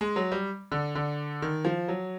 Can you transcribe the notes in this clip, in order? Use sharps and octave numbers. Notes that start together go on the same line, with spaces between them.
G#3
F#3
G3
D3
D3
D#3
F3
F#3